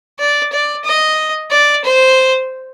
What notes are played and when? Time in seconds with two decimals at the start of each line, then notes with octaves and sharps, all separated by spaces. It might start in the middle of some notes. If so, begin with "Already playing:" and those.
0.19 D5
0.52 D5
0.84 D#5
1.51 D5
1.84 C5